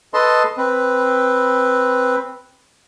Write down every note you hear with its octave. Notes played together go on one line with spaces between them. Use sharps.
A4 B4 D#5 A5 C6
C4 B4